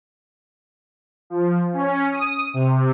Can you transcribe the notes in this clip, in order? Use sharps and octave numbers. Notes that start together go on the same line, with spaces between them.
F3
C#4
D#6
C3